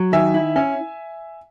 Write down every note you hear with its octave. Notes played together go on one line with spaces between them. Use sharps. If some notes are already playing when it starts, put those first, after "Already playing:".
Already playing: F#3
D#3 E5 G#5
E4
C#4 E5 G#5